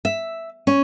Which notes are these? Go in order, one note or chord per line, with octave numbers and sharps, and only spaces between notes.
E5
C#4